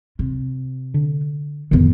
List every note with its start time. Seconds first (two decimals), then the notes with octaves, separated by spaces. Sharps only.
0.19 C3
0.94 D3
1.71 F2 A2 D3 D#3 B3